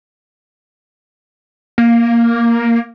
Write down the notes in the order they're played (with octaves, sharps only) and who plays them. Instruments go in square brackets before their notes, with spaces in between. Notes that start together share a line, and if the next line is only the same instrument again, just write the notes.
[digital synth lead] A#3